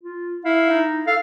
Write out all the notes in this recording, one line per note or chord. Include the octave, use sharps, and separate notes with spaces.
F4
E4 F5
D#4
A4 F5